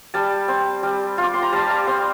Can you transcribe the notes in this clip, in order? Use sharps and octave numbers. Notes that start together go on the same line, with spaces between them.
G3 A5
C4
G3
F4
D6
C6
A#5
G3 A5
A#5
C4 C6